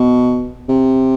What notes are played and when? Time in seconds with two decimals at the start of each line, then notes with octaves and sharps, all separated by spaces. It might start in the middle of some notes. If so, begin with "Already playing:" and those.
Already playing: B2
0.69 C3